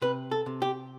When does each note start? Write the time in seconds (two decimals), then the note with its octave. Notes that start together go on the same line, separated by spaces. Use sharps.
0.02 C3 B4
0.31 A4
0.46 C3
0.62 G4